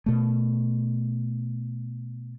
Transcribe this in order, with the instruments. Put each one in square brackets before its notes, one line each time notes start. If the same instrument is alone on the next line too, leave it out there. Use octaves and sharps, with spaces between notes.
[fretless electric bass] B2 A3